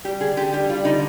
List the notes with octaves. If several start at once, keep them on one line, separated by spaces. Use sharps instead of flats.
G3 G4
D3 G#4
D3 G4
G3 G4
G3 F4
D3 D#4